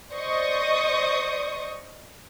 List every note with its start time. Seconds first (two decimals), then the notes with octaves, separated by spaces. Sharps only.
0.11 C5 D5 D#5 C#6 D#6